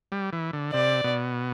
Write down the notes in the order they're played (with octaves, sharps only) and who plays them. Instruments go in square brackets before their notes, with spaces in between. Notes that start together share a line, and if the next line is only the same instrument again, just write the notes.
[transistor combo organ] G3
E3
D3
[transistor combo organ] C3 [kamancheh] D5
[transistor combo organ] B2